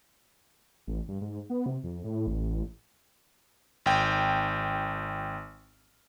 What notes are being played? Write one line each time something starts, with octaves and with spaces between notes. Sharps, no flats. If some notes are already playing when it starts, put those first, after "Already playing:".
A1
G2
G#2
B3
C3
F2
A2
A1
G#1 G5